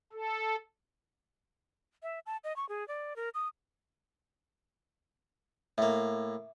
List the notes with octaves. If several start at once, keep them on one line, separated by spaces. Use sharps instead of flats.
A4
E5
A5
D#5
C#6
G#4
D5
A#4
D#6
A2 A#3 E5